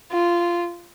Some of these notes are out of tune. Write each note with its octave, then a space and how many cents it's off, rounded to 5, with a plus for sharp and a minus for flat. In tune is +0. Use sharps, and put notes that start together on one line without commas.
F4 -10